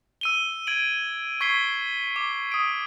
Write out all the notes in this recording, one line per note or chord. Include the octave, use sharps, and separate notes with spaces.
E6 D#7 G7
G#6 D7 F#7
C#6 G#6 B6 C7 G7
D6
D#6 D7